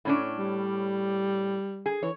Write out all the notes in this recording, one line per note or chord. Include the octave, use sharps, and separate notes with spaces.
A2 C#4 D4
G3
G#4
E3 C#5